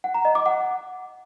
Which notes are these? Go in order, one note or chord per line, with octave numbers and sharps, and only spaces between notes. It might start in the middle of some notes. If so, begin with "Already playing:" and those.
F#5
A#5
D#5
D6
F#5